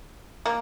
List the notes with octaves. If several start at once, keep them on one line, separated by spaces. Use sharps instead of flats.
A#3